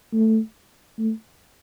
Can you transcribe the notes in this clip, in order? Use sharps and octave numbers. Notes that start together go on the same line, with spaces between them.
A3
A3